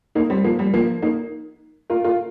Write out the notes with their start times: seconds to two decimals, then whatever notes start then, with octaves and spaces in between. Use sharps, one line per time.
0.15 A#3 D#4
0.30 G3 C4
0.44 F3 A#3
0.59 G3
0.74 F3 A#3
1.02 A#3 D#4
1.90 F4 A#4
2.04 F4 A#4